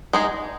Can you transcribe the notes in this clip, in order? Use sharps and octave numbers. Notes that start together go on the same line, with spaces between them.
G#3 D#4 G#4